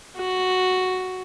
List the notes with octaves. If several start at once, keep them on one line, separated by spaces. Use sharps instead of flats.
F#4